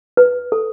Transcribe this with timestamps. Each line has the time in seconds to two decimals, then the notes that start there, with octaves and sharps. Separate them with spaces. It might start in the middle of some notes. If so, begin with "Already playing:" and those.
0.17 B4
0.52 A4